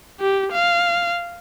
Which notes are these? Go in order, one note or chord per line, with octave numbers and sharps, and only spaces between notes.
G4
F5